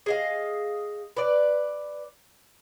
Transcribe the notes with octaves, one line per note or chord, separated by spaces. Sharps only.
G#4 D#5 F5
B4 D5